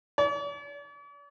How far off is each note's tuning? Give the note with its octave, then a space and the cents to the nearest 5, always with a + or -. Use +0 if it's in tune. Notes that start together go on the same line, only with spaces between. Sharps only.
D5 -45